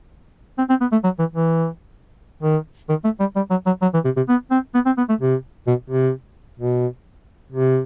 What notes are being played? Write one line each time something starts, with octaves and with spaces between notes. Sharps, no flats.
C4
C4
B3
A3
F#3
E3
E3
D#3
D#3
A3
G3
G3
F#3
F#3
F#3
E3
C3
C3
B3
C4
B3
C4
B3
A3
C3
B2
C3
B2
C3